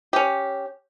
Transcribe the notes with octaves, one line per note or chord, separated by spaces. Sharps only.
C#4 G4